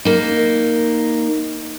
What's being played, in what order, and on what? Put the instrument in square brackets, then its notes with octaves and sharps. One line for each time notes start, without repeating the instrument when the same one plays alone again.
[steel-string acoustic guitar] A#3 D#4